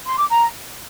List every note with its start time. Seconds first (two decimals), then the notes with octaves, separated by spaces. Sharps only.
0.06 C6
0.18 D6
0.30 A#5